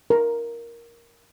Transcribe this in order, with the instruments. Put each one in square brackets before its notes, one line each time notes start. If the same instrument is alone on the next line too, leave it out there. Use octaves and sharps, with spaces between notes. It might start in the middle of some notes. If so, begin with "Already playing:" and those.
[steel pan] A#4